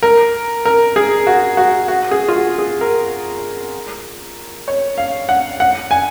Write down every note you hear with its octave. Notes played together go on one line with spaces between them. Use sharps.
A#4
A#4
G#4
F#4
F#4
F#4
G#4
F4
F#4
G#4
A#4
C#5
F5
F#5
F#5
G#5